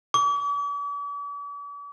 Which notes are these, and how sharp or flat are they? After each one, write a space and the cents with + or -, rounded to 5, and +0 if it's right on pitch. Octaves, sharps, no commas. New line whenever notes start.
D6 -45